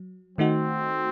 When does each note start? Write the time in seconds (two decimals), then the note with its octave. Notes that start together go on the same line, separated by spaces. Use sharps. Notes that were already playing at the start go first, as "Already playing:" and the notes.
Already playing: F#3
0.38 D#3 A3 C4 D#4 F#4